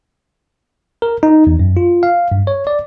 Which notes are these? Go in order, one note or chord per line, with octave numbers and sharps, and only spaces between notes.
A#4
D#4
E2
F#2
F4
F5
G2
C#5
D5